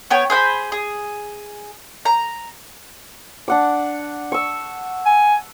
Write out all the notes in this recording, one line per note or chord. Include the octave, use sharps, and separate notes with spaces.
B3 C#5 G5
G#4 C5 F#5 B5
G#4
A#5
D4 F#5 D6
C#6 E6
G#5